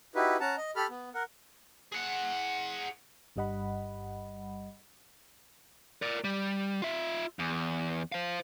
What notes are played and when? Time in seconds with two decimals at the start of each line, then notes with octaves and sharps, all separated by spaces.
0.15 D#4 E4 F#4 G4 B4
0.40 C#4 F#5 A5 A#5
0.57 D#5
0.76 G4 A4 B5 F6
0.90 B3
1.14 A#4 F#5
1.92 G#4 F#5
3.36 G1 G2 G3 D#5 F#5 B5
6.02 A#4 D5
6.24 G3
6.82 F4 E5
7.39 E2
8.12 C5 F5